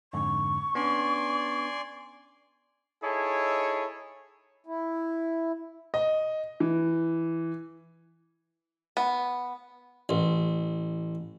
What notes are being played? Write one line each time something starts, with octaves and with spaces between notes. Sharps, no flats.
F2 G#2 D3 C#6
B3 C#4 D4 D5 G#5 C6
D#4 E4 G#4 A4 C#5
E4
D#5
E3
B3
A1